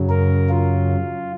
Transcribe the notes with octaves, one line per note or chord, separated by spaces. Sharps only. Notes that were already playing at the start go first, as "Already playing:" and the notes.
Already playing: F#2 C#3 F#3
A#4
F4